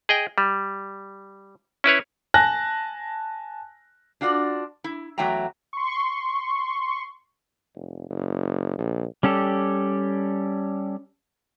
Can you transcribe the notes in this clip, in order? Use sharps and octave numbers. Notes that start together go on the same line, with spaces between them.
G#4 D#5 G5
G3
C#4 E4 B4 C#5
G#5 A5 F#6 A#6
D4 F4 F#4 A#4 D5
E4
E2 F#3 A3 E5 G5 A#5
C6 C#6
F1
F#1
A#1
G3 C#4 G4 A4